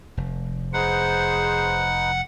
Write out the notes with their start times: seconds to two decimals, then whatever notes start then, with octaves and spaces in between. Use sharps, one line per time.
0.17 F1
0.73 D#4 G#4 B4 C5 F#5